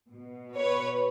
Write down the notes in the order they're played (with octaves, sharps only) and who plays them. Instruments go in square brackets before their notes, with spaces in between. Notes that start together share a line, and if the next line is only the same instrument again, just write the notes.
[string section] B2
B4 C#5